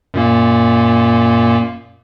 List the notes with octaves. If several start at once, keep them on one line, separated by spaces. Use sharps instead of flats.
F#2 A#2 A#3